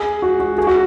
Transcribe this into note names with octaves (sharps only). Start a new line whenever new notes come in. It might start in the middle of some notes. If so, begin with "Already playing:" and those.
Already playing: G#4
F#4
F#4
G#4
F#4